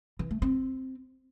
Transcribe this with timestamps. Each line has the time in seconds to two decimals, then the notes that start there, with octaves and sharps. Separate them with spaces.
0.19 E3
0.31 A3
0.42 C4